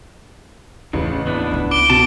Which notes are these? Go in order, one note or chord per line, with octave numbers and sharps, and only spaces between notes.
A1 E2 C#3
D#2 B3 D4 E4
C#2 C#4
D6 D7 G7
B2 A4 A5